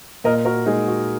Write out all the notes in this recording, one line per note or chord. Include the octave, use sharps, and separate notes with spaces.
A#2 A#4 D#5
F#4 A#4
G#3 D#4 G#4
F#4